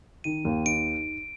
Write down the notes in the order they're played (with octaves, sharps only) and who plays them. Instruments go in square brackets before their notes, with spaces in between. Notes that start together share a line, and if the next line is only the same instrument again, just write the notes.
[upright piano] D#3 [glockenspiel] D#7
[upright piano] D#2
[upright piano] D#4 [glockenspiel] D7